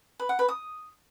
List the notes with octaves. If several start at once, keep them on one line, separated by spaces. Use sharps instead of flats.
B4
F#5
B4
D#6